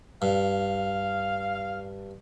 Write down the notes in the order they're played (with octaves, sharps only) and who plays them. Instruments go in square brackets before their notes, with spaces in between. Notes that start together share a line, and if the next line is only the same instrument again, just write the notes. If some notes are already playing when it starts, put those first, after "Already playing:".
[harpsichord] G2 [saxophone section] F5